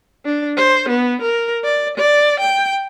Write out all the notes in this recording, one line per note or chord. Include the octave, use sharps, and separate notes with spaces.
D4
C5
B3
A#4
D5
D5
G5